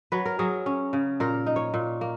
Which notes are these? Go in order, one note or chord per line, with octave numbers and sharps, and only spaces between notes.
F#3 B4
A#4
F#3 G#4
C#4
C#3
A#2 A#4
D#4
C#5
A#2
A#3